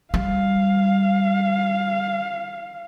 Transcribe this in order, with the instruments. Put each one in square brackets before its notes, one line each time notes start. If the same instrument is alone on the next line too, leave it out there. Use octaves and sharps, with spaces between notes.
[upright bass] G3 [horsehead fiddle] F5